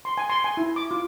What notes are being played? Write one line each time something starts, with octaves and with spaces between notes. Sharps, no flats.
C6
G#5
C6
G#5
E4
D6
F4